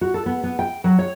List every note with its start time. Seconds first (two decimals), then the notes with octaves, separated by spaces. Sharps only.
0.01 F#4
0.14 A4
0.26 B3
0.44 B3
0.59 G5
0.84 F#3
0.99 C#5